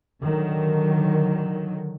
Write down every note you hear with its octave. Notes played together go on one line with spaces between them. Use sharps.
D3 D#3 F#3